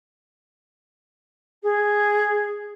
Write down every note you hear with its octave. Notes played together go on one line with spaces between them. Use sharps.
G#4